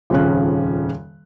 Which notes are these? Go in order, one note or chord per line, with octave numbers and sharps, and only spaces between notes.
D#1 F2 C#3 C#4 F#6